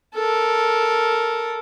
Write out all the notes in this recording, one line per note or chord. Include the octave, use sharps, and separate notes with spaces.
A4 A#4